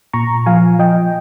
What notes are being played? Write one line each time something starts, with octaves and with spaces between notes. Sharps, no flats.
A#2 A#5 C#6
F3 F5 G#5
F3 D#5 G5